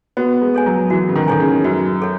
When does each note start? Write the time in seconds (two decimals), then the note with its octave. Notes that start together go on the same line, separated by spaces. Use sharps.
0.17 B3 F#4
0.41 G#3
0.54 A4 C#5 G#5
0.66 F#3
0.90 E3 F#4
1.09 C#3
1.16 D#3
1.28 D#3 A4 C#5 G#5
1.40 C#3
1.64 F#2 F#4
2.02 A4 C#5